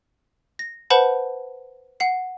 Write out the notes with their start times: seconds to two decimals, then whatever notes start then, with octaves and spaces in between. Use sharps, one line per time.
0.59 A#6
0.90 B4 C5 F#5 A5 B5
2.00 F#5 C7